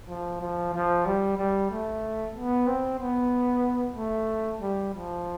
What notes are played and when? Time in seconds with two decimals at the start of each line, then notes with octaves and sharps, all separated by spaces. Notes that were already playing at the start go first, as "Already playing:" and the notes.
0.09 F3
0.41 F3
0.74 F3
1.06 G3
1.38 G3
1.71 A3
2.35 B3
2.67 C4
3.00 B3
3.96 A3
4.61 G3
4.94 F3